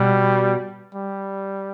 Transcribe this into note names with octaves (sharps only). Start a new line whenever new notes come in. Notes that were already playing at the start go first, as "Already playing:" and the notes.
Already playing: B2 G3
G3